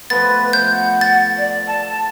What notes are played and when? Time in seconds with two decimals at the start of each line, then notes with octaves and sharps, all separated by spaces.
0.10 F3 A3 B3 B4 A6
0.53 C5 G6
0.72 F#5
1.01 A6
1.38 D5
1.67 A5